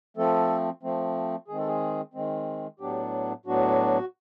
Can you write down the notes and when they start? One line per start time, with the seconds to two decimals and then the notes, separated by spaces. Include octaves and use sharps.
0.17 F3 A3 C4 A4
0.83 F3 A3 C4
1.48 D#3 G#3 C4 G#4
1.59 A4
1.67 G#4
2.14 D#3 G#3 C4
2.80 A2 F#3 B3 D4 G4
3.46 A2 F#3 B3 D4 F#4